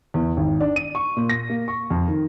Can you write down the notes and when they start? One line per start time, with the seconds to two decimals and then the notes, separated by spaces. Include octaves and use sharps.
0.14 E2
0.37 G#1
0.60 D4
0.76 D#7
0.95 C#6
1.17 A#2
1.29 A#6
1.50 A#3
1.68 C#6
1.90 F2
2.08 D#3